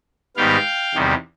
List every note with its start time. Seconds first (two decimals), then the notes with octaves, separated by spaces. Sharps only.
0.37 G#2 D#3 G3 B3 F5 G5
0.95 E2 C3 D#3 G3